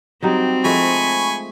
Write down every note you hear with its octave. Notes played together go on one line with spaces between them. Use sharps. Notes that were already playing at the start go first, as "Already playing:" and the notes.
F#3 G3 C4 D#4
F3 G#3 A3 G#5 B5 C#6